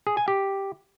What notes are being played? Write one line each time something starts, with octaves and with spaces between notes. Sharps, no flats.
G#4
G#5
G4